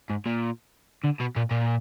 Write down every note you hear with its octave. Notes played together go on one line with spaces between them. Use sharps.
G#2
A#2
D3
B2
A#2
A#2